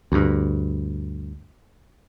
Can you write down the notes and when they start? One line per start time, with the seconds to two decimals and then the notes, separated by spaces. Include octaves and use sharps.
0.12 D2 G2